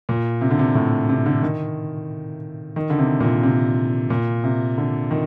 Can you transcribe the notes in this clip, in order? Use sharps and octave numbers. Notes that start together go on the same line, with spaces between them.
A#2
C3
D3
C3
A2
C3
D3
D#3
D#3
D3
C3
A#2
C3
A#2
C3
D3
D#3